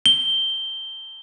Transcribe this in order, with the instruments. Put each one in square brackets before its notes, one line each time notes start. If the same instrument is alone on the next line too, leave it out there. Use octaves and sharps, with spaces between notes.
[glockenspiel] G7